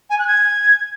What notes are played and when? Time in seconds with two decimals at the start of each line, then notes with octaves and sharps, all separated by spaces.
0.10 G#5
0.19 F#6
0.28 G#6